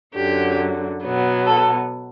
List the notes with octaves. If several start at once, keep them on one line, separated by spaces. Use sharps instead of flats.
F#2 D3 F#3 G4
B2 F#3 B3
A4